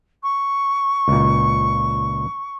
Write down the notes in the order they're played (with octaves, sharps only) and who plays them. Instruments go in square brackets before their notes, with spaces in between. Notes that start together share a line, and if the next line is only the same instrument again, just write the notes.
[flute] C#6
[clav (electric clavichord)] C#2 A#2